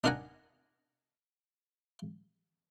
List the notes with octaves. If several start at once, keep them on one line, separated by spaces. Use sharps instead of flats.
D4 D#4 A#4 F#5 G#5 A#5